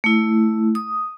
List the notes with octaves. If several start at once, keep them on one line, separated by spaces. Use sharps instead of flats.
A3 E4
D#6